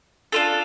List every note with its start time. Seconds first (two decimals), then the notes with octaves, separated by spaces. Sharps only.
0.32 D4 F4 A4